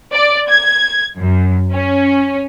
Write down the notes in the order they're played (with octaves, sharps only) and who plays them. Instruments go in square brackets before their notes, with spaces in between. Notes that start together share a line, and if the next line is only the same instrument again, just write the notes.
[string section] D5
G#6
F#2
C#4